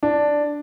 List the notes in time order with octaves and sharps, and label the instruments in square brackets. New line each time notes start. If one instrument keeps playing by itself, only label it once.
[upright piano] D4